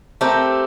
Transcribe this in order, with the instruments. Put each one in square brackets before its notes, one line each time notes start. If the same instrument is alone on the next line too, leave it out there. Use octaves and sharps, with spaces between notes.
[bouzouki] A3 C4 G4 A#4